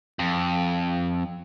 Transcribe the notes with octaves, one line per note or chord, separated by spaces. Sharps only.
F2